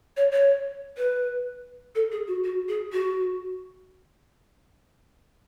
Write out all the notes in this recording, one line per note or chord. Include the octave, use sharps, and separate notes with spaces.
C#5
C#5
B4
A4
G#4
F#4
F#4
G#4
F#4